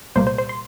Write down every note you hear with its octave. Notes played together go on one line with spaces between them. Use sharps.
C2 A#2 G3 A#3 C5
C5
C5
C6